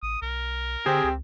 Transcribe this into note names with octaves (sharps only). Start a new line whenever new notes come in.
A1 D#6
B1 A#4
D3 C4 G4 G#4
C#2